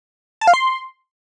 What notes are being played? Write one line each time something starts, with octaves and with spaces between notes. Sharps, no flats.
A5
F5
C6